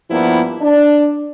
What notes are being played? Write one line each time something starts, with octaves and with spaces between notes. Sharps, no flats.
G2 F3 A#3 B3 E4
D4